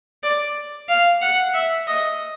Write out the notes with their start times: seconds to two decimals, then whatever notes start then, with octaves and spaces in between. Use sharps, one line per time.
0.23 D5
0.88 F5
1.22 F#5
1.54 E5
1.87 D#5